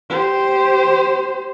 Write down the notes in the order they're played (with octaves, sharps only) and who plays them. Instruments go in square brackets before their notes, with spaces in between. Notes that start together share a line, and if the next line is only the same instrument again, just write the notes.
[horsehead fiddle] G4 C5